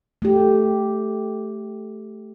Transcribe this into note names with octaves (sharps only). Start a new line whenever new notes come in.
A3 G4